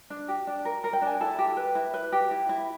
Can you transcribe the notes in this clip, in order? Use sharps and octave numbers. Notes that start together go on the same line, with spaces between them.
D4
G4
D4
A#4
A#4
G5
D4
G#5
E4 A4 A5
G4
B4
E4
B4
G4
E4
E4